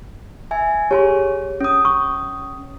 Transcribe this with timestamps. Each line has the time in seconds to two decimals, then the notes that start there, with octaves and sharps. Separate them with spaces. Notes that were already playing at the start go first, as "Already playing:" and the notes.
0.51 E5 G#5
0.91 G4 G#4 C#5 G#5 C6
1.61 C#4 D#6
1.85 C#6